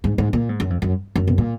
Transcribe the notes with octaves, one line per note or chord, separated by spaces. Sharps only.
G#2
G#2
A#2
G#2
F#2
F2
F#2
F#2
B2
A#2